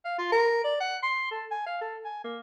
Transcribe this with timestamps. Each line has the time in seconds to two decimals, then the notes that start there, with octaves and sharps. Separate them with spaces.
0.05 F5
0.18 F4
0.32 A#4
0.64 D5
0.80 F#5
1.03 C6
1.31 A4
1.51 G#5
1.66 F5
1.81 A4
2.05 G#5
2.24 A#3